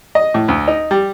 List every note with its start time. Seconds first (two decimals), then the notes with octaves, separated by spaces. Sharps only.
0.15 D#5
0.34 A2
0.48 D2
0.68 D#4
0.91 G3